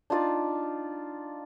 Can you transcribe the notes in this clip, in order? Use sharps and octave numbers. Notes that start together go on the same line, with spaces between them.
D4 D#4 F4 D5